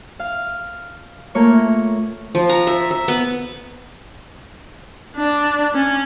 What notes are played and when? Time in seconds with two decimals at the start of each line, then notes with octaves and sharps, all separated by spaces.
0.19 F5
1.35 A3 A#3 F4 A#4 C#5
2.35 F3
2.49 A#5
2.67 E5
2.91 E5
3.08 B3
5.16 D4
5.74 C#4